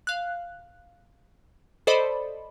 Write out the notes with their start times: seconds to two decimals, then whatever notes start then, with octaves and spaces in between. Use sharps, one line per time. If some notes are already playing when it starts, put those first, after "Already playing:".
0.07 F5 F#6
1.87 A4 C5 D5 D#5 B5